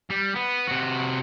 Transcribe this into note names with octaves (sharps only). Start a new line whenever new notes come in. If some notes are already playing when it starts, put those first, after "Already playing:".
G3
B3
C3 F#4